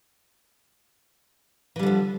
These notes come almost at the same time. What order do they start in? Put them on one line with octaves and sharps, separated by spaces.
E3 G3 D3 F3